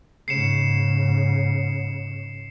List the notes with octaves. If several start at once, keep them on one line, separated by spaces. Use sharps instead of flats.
G#2 C#3 C7 C#7 E7